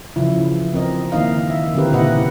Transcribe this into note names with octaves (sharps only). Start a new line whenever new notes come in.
C#3 E3 F3 E4
C4 A#4 D#5
D#3 A#3 D#4 E4 D#5 F5
E5
D3 E3 C4 G4 A#4 B4
A#2 C#3 E4 B4 D#5 F#5